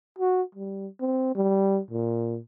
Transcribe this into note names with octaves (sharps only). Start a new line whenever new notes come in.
F#4
G3
C4
G3
A#2